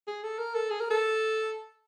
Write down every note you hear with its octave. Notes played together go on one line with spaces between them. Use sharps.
G#4
A4
A#4
A4
G#4
A#4
A4